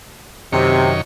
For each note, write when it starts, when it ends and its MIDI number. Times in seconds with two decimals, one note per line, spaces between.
0.52 1.01 42
0.52 0.91 48
0.52 1.01 51
0.52 1.01 73